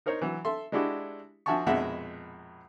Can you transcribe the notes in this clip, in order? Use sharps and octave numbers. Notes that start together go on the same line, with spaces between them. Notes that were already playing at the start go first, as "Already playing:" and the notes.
D#4 A#4 C5 C#5
E3 F#3
A4 E5 C6
G#3 D4 E4 F#4 G4
F3 F#4 E5 G#5 A5 C#6
A#1 F2 B2 G#3 E5 F#5